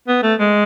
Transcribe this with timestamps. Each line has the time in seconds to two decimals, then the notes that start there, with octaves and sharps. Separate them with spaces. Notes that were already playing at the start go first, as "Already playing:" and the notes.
0.08 B3
0.23 A3
0.40 G#3